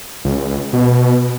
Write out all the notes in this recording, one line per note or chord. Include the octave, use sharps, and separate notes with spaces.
C#2
B2